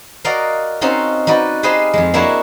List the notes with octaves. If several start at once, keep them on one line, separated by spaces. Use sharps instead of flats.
F#4 A#4 D5 D#5 F5
C4 C#4 D#4 F4 F#4
D#4 F#4 B4 D5
G4 G#4 B4 C5 D#5 F5
F2 G#3
A#3 D4 E4 F#4 C#5 E5